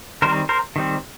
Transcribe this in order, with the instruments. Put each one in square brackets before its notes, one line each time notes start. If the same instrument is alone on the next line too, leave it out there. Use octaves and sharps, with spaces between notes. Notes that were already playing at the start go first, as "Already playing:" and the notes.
[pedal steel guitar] D#3 G3 C4 A#4 C5
A#4 C5
D#3 G3 C4